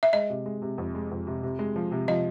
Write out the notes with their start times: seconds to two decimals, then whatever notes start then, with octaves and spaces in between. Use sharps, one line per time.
0.03 E5
0.13 G#3 D#5
0.30 C3
0.46 G#3
0.62 C3
0.78 F2
0.95 G#3
1.11 F2
1.27 C3
1.43 C3
1.59 G#3
1.76 F3
1.92 C3
2.08 F3 D#5